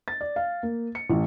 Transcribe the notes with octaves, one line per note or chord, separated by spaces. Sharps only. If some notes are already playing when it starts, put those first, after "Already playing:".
A6
D5
F5
A#3
C#7
A1